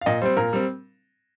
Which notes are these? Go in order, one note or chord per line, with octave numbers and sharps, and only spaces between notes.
F5
A#2 D#5
G3 C4 C5
A#2 A#4
G3 C4